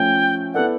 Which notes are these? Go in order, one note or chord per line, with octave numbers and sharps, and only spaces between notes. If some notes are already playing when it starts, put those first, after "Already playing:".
Already playing: F3 A3 C#4 G5
B3 E4 A4 D5 F#5